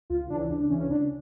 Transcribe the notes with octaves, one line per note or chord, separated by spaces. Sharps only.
C#2 F4
C#3 E3 D4
C#2 D4
D4
C#3 E3 C#4
C#4
C#2 D4